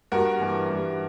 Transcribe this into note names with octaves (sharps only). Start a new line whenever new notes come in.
G2 F#4 A#4
E3 G3
G2